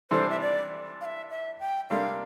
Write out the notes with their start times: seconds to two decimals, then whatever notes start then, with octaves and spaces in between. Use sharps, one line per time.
0.11 C3 E3 G3 D4 A4 C5
0.30 E5
0.40 D5
1.01 F5
1.05 E5
1.30 E5
1.60 G5
1.90 C3 G3 A#3 D4 A4 F5